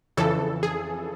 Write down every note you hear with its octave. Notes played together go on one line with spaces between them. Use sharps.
F2 C#3 E3 A4
G#4